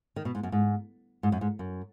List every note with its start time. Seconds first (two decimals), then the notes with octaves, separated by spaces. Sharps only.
0.16 D#3
0.25 B2
0.35 G#2
0.43 F#2
0.52 G#2
1.23 G#2
1.32 F#2
1.41 G#2
1.59 F#2